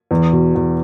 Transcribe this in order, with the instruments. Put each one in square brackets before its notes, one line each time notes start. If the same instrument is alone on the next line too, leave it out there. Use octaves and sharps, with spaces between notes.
[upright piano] E2
B2
E2